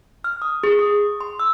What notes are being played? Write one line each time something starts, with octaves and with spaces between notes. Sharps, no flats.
F6
D#6
G#4
D#6
C6
E6